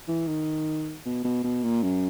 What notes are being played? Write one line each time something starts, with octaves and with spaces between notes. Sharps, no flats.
E3
D#3
B2
B2
B2
A#2
F#2